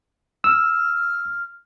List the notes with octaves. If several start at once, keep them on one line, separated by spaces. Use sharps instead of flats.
E6 F6